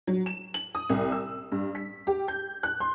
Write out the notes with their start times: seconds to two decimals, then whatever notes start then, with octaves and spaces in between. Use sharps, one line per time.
0.07 F#3
0.26 E7
0.54 F#7
0.75 D#6
0.89 C2
1.12 E6
1.52 G2
1.75 B6
2.07 G4
2.28 G6
2.63 F#6
2.80 C6